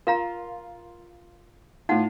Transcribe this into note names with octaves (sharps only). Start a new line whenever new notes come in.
F4 A#4 F5 A#5
A2 D#4 F4 F#5